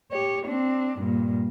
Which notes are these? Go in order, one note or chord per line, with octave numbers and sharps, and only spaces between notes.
G4 C#5
C4 D4
G2 A#2